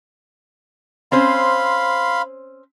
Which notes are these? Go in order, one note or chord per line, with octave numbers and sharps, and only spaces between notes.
C4 C#4 C5 F5 B5 C6